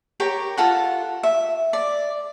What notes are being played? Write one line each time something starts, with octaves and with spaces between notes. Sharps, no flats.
G4 A#4 C#5 G5
F4 A4 F#5
E5
D5